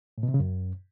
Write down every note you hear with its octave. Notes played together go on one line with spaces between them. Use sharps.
A2
B2
C3
C#3
F#2